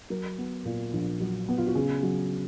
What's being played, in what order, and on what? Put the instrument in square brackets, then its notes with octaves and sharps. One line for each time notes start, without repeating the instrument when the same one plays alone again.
[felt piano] F#3 A#4
B3
A#2
A#1
F#3
B3
F4
F#4
C#3 G#4
F#3